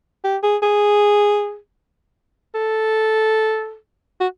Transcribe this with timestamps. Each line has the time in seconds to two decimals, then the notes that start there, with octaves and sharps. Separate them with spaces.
0.24 G4
0.43 G#4
0.63 G#4
2.55 A4
4.21 F#4